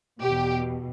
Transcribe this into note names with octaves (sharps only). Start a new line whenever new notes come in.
B2 G4
E2